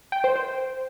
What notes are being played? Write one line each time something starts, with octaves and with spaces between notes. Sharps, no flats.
G5
C5
C5